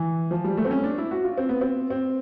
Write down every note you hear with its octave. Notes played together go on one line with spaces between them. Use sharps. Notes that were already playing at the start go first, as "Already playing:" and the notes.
Already playing: E3
F3
G3
A3
C4
C#4
D4
E4
F#4
F4
C4
B3
C4
C4